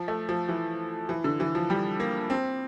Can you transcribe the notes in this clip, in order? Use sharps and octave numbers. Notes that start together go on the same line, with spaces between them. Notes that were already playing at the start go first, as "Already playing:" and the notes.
Already playing: F3
A3
F3
E3
E3
D3
E3
F3
G3
A#3
C4